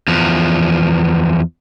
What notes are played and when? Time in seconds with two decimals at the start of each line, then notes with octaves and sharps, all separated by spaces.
0.08 E2 F3